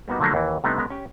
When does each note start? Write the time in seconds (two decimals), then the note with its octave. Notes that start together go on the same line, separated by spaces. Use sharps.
0.08 G3 A#3 B3 D#4 F#4
0.20 D3 F3 F#3 A3 A#3 D4
0.34 D#2 E3
0.64 C3 G3 A3 B3 D4 D#4
0.78 G#3 B3 C#4 A#4
0.90 C#4 G4